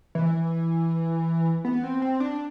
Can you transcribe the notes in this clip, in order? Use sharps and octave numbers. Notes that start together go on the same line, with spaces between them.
E3
B3
C4
C4
D4